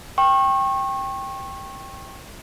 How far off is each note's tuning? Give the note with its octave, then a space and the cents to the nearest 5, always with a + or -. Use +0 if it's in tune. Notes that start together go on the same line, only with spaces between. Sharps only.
G5 +0 C#6 -30